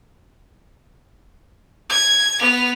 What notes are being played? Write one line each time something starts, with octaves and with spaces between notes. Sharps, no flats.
G#6
B3 F7